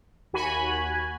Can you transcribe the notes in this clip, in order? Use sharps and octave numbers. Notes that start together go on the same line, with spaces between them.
D#2 F#4 G#5 B5 F#6